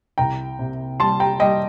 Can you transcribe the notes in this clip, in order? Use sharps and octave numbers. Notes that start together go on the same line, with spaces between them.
C2 G5 A#5
C3
G3 A5 C6
G5 A#5
G3 D#5 G5